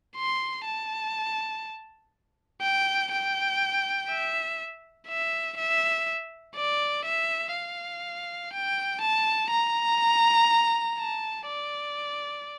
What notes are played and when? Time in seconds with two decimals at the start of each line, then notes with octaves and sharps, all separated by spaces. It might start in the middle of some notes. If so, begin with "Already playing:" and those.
0.17 C6
0.66 A5
2.62 G5
3.12 G5
4.10 E5
5.08 E5
5.58 E5
6.56 D5
7.06 E5
7.54 F5
8.53 G5
9.01 A5
9.51 A#5
10.99 A5
11.47 D5